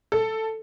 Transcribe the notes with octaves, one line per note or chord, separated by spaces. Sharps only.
A4